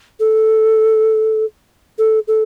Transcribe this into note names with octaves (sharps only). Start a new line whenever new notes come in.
A4
A4
A4